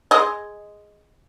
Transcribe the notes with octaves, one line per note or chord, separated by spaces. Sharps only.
G#3 D#5